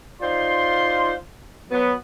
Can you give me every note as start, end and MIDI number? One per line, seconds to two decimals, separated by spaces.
0.22 1.14 63
0.22 1.14 65
0.22 1.14 72
0.22 1.14 74
0.22 1.14 84
1.71 1.93 54
1.71 1.93 59